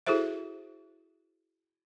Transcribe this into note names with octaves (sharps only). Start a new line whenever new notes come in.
E4 F#4 G#4 A4 C5 E5